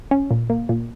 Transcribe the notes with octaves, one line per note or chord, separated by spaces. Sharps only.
C#4
A#2
A#3
A#2